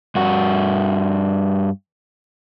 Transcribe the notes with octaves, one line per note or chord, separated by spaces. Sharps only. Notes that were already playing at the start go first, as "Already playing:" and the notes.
G2 F#4